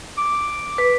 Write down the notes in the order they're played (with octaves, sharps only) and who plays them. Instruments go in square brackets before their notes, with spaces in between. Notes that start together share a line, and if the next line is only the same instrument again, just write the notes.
[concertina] D6
[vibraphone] B4